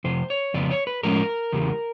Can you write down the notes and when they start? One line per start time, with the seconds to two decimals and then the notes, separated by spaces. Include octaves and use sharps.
0.04 F2 C3 C5
0.30 C#5
0.54 F2 C#3 B3 D5
0.71 C#5
0.87 B4
1.03 A2 F3 G#3 C#4 A#4
1.52 E2 C#3 G3